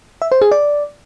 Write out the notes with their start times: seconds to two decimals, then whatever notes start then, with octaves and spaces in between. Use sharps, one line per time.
0.22 E5
0.32 C5
0.42 G#4
0.52 D5